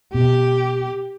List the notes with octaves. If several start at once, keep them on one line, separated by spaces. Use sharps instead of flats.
B2 G4